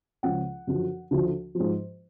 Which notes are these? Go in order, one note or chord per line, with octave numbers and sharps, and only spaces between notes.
C#2 C#3 F3 F#5
F#2 D3 F3
D2 D3 F3
F3
G#2